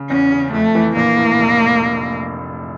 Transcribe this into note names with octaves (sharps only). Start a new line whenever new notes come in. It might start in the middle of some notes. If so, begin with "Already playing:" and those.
Already playing: C#3
E2 C#4
C#3
F2 A3
E3
A#1 A#3
A2
F1